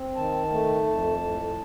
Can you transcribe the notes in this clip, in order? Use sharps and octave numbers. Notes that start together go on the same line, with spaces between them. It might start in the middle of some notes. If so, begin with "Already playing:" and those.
Already playing: C4
D#3 A5
A3
F2
A2